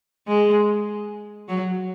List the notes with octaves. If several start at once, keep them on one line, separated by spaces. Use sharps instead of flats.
G#3
F#3